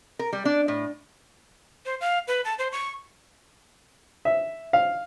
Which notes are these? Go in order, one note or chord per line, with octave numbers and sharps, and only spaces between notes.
A#4
G3
D4
A2
C5
F5
B4
A5
C5
C#6
E5
F5